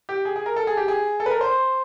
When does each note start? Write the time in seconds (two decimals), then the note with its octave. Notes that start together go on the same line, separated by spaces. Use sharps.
0.09 G4
0.25 G#4
0.36 G#4
0.46 A#4
0.56 A4
0.67 G#4
0.77 G4
0.88 G#4
1.20 A4
1.26 B4
1.31 A#4
1.41 C5